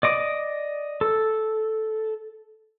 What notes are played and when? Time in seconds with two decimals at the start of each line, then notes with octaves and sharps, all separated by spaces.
0.03 D5 D#5 D6
1.01 A4